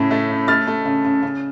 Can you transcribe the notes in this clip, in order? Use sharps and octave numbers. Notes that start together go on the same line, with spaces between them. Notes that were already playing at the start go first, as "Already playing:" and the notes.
Already playing: A2 C#3 A3
A3
C#3
A3 F6 A6
A3
C#3
C#3
C#3